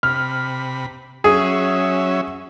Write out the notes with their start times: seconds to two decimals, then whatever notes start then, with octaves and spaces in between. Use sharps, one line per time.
0.03 C3 B5 F6
1.24 F#3 C#4 G#4 E5